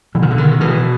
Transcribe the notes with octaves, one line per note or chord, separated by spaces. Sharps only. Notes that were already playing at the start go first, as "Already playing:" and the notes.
B2 E3
D#3
D3
D#3
B2 E3